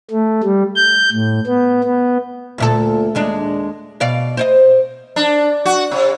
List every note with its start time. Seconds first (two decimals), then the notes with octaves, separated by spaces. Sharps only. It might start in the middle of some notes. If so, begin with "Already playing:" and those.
0.11 A3
0.44 G3
0.76 G6
1.12 A2
1.46 B3
1.84 B3
2.58 D2 A#2 A4
3.15 D#2 G#3 D4
4.00 B2 D5 F5
4.37 C5 C#5 D#5
5.16 D4
5.66 F#4
5.91 C3